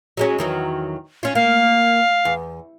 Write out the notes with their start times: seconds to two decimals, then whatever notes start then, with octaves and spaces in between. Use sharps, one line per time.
0.17 F#3 G#3 C#4
0.38 E2 D#3 F#3
1.23 C#4 F4
1.35 A#3 F5
2.25 E2